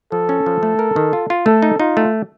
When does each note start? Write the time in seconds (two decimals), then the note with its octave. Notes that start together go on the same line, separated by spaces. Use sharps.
0.12 F3 A4
0.29 C#4
0.46 F3
0.63 A3
0.79 A#4
0.96 D#3
1.13 F4
1.30 F4
1.46 A3 A4
1.62 D#4
1.80 D#4 F4
1.97 A3